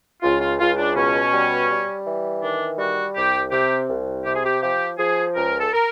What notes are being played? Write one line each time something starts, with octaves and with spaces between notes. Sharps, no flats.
C#2 F4
F4
C#2 F4
D4
B2 C#4
G3
G3
E3
D#3 D4
G3 F#4
C2 G4
C3 G4
C2
C3 G4
G#4
G4
F3 G4
F3 G#4
C#2 A#4
A4
A#4